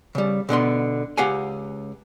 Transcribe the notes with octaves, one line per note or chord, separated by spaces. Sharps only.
C#3 G3
B2 D3 B3 C6
C#2 G4 F5 F#5 G#5